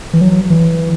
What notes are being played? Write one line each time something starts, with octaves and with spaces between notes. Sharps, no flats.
E3
F#3
E3